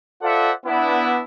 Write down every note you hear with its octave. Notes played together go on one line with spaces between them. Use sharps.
F4 A4 C5 D5 E5 F#5
B3 D4 E4